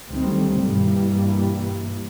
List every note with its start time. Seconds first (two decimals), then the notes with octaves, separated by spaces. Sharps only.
0.10 D2 D#3 F#3 G3 A3 C4
0.62 G2 B2 E3 G3 A#3